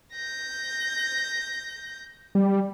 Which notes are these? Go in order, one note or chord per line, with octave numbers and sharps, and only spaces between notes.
G6 A#6
G3